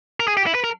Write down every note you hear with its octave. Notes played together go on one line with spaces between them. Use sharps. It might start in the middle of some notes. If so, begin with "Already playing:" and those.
A#4
G#4
G4
E4
B4
A#4